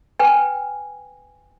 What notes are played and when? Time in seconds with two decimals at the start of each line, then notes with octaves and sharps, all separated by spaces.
0.19 B4 G5 G#5